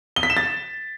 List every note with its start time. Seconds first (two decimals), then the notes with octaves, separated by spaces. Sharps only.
0.16 G7
0.23 B6
0.30 E7
0.37 A6